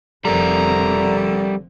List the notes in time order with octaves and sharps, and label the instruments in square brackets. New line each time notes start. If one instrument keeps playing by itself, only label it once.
[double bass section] F1 F3 C4 [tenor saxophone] D3 [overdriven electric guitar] G3 A#4 [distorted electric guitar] A#5